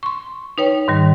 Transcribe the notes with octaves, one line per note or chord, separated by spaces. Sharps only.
C6 C#6
D#4 B4 C#5 G5
G#2 D#3 G3